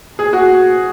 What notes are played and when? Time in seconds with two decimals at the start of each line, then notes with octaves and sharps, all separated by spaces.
0.19 G#4
0.33 F#4